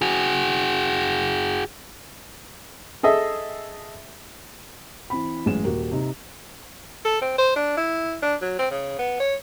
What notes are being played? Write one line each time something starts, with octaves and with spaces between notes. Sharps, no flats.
F#4 G#4
G#4 A4 D#5 E5
E3 C4 B5
A1 F#2 G#3 C#4 E7
D#1 F#4 G4 A#4
C3 D#4
A4
C4
C5
D4
E4
D4
F#3
C4
C#3
B3
C#5